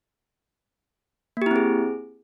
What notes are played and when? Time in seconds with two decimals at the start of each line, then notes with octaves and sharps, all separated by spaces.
1.37 A#3
1.42 G4
1.46 E4
1.51 C4
1.56 G#4